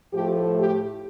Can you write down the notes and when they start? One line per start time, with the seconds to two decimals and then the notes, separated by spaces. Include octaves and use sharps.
0.13 A2 F3 A3 G4
0.58 G4